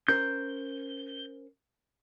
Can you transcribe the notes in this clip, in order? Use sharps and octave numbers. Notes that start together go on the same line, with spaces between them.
C#4 A#4 C5 G6